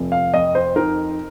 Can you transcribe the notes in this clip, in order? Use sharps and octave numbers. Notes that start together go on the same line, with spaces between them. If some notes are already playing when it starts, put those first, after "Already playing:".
Already playing: F1 F3
F5
F2 D#5
C5
D#4 A#4